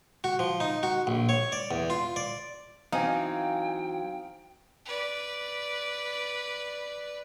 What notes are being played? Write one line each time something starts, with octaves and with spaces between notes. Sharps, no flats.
F#4
F3
D#4
F#4
A#1
C#5
D5
E2
F4
D5
E3 F#3 C4 D#4 F5 G5 G#5
B4 D5